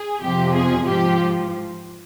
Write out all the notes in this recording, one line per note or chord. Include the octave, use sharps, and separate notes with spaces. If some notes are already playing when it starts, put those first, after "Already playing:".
Already playing: G#4
F2 C3 F3 G4
G#4
G#2 F3 G4